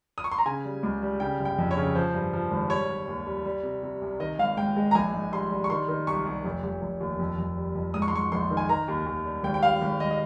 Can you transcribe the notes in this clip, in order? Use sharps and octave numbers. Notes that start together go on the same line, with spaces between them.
D#6
C#6
C6
A#5
C#3 G#5
G3
C#2
G3
C#3 G5
G1
G5
F2
C#5
C#3
F3 C5
G2
F3
G#1
G3 C#5
G3
D#2
G3
G3
C3
C3
C2
D#3 D#5
G#1 F5
G#2 G5
G#3
A#5
A#1 G#5
G#2
G3 C6
G3
C#6
D#3 C6
D#3
C2 C#6
C2
F1
F1
F1
D#2
F2
F2
G3
F2
G#2 D#6
C#6
C6
G#2 C#6
A#1 C6
D#3
G#5
D#3 A#5
D#2
D#2
G3
G#1 G5
G5
G3 F5
G#1
G#1 D#5
D#5